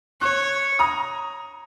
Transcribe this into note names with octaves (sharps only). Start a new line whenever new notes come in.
C#5 C#6 F#6
A#5 D#6